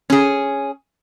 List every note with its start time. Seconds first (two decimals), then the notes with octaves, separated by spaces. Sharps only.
0.10 C#4 G#4